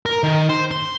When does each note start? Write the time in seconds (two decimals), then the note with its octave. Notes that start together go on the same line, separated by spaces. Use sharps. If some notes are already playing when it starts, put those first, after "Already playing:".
0.06 A#4
0.24 D#3
0.50 C5
0.71 C6